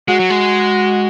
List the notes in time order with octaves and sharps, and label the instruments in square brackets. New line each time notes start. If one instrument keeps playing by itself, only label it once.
[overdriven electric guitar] G#3 [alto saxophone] F#4
[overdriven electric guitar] F#3
G#3